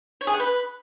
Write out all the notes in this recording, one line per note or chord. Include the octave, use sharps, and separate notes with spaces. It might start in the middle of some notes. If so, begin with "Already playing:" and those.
C#5
G#4
F#5
B4